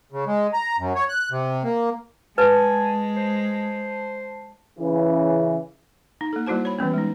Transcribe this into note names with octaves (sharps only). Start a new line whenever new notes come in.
C#3
G#3
A#5
F#2
C#5
F#6
C3
A#3
G#3 B4 G#5 A5
C5
C#3 E3
D#4
A#3 A4
G3 A#3 E4 F#4 C5 A5
C#5 B5
E3 G3 B3 C#4
G#3 D#4